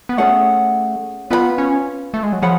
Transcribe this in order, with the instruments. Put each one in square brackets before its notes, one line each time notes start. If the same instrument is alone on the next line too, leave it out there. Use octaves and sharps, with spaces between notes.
[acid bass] B3
[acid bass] A3 [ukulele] C#4 G#4 C#5 F#5
[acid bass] B3 [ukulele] F4 B4 F#5 B5
[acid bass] C#4
A3
G#3
F#3
[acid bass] F3 [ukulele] G#4 C#5 F#5 B5